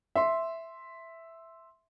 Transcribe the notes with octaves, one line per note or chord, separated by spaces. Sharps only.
E5 C6